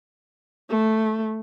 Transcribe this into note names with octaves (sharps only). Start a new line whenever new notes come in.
A3